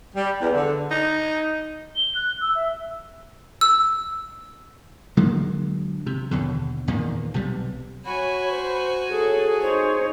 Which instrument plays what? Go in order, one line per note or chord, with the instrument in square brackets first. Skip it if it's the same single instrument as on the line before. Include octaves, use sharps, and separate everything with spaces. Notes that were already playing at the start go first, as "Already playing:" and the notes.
[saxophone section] G3
E2
D3
[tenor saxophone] D#4
[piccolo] G7
F#6
E6
E5
[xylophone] E6
[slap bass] D3 F#3 G#3 A#3
C3
D#2 B2 D3
E2 A#2 D#3 A#3
B1 C3 G3
[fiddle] F#4 G#5 [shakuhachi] C#5 [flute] B5
[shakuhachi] C5
[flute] G#4 [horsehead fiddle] A4 [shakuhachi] C#5
[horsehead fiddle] D#4 C#5 [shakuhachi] C5